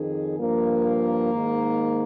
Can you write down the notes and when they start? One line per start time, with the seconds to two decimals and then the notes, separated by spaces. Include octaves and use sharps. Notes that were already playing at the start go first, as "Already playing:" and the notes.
Already playing: F2 D#3 G#4
0.37 G2 F3 A#3
1.32 G#2 D#3